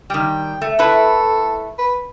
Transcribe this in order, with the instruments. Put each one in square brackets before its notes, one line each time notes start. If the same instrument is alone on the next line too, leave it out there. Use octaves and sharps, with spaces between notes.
[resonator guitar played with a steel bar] D#3 G3 [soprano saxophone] G5
[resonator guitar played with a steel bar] A3
[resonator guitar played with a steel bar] A3 E4 B4 [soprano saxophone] A4
[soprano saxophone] B4